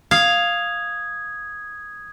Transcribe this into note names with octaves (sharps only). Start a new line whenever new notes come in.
F5 D#6 G#6